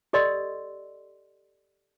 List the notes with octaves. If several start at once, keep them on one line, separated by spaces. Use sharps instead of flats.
G4 A4 D5 D#5 C6 E6